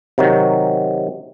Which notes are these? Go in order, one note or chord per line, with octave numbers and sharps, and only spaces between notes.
C3 D#3 F#3